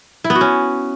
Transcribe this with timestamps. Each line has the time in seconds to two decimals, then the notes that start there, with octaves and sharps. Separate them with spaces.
0.24 E4
0.30 B3
0.35 F#4
0.41 C#4